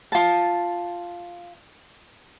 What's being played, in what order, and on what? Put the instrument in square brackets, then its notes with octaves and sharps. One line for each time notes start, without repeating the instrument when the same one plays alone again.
[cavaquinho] F4 A5